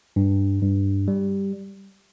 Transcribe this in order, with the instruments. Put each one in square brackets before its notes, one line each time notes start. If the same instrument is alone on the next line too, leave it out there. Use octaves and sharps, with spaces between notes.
[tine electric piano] G2
G2
G3